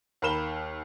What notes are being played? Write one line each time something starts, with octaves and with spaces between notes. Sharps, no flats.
D#2 A#4 B5 E7 G7